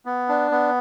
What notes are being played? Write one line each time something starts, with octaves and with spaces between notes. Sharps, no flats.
B3
D4
B3